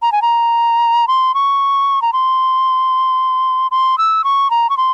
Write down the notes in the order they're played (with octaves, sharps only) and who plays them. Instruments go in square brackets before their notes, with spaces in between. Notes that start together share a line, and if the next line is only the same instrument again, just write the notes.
[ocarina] A#5
G#5
A#5
C6
C#6
A#5
C6
C6
E6
C#6
A#5
C#6
C6